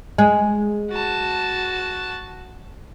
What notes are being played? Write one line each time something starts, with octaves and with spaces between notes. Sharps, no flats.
G#3
F#4 A5